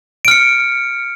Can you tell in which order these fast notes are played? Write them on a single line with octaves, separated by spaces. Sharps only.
D7 F6 C#7